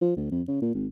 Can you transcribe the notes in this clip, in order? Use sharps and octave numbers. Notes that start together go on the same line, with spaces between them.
F3
D2
F2
C#3
A#2
G#1